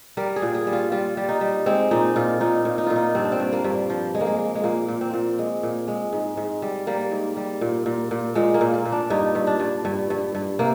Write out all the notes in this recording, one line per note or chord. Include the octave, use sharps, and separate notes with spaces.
G3 A#4
G#4
A#2
G#4
G3
F4
G3 F4
G3
D#4
G3
G#3 C4
A#2 D#4
A#2 F4
A#2 D#4
A#2
D#4
A#2 F4
D#4
G2 C4
D4
C4
G2
A#3
G2
F3
G#3
A#3
G#3
G#3
G#3
A#2 A#3
A#2
C4
A#2
G#3
A#2
G#3
G#2
G#2
G3
G3 A#3
G#2
G3
A#2
A#2
A#2
A#2 G#3
A#3
A#2
A#3
A#2
D4
G2 D#4
G2
D4
G2
G2
G2
G2
C3 A#3